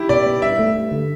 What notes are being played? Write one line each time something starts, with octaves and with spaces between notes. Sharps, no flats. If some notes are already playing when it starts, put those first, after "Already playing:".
Already playing: E4 G4
B2 D5
B3
G2 E5
A3
G2
D3